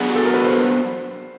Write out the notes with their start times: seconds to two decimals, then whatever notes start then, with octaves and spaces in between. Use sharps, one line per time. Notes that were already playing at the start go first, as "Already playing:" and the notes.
Already playing: F#3 B3 D4 F#4 G#4
0.15 A4
0.25 A#4
0.34 B4
0.44 C5